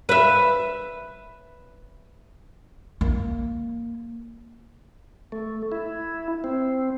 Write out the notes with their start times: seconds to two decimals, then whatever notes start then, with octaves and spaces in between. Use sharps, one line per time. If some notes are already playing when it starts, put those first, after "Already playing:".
0.09 B4 E5
3.01 A#3
5.32 A3
5.72 E4
6.44 C4